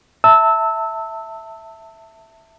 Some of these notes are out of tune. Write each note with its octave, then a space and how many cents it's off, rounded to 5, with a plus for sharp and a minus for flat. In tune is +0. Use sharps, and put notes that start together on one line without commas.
E5 +0 A5 +25 E6 -15